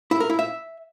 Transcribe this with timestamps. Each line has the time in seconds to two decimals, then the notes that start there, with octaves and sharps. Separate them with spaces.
0.11 E4
0.20 A#4
0.30 E4
0.39 E5